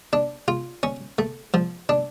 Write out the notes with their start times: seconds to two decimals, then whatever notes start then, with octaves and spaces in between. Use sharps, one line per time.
0.13 D4
0.48 F4
0.83 C#4
1.19 A3
1.54 F3
1.89 D4